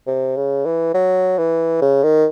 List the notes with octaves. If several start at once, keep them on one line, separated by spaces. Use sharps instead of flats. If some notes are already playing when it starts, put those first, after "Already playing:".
C3
C#3
E3
F#3
E3
C#3
D#3